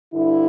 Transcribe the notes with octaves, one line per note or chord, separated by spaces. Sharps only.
G2 D3 E4